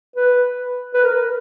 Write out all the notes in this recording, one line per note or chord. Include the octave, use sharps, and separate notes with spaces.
B4
B4
A#4